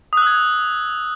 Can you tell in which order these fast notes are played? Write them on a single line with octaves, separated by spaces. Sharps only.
D#6 F#6 E6 G#6